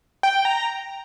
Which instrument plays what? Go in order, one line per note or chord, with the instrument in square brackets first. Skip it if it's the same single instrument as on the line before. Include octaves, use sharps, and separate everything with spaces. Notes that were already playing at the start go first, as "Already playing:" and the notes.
[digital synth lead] G5
A#5